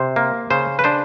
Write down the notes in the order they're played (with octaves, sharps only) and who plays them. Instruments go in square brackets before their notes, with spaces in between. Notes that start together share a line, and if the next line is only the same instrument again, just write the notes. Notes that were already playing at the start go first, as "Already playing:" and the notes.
Already playing: [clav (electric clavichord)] C3 C5
A#3
C#3 C5
B4
D4 C5